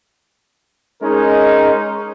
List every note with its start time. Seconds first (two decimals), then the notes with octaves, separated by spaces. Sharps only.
1.02 G#3 C#4 D#4 A#4